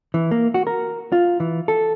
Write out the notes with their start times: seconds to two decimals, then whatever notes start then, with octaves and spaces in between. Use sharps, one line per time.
0.14 E3
0.31 A#3
0.54 F#4
0.67 A#4
1.12 F4
1.40 E3
1.68 A4